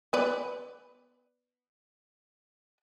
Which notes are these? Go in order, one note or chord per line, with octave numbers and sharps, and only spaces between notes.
B3 B4 D5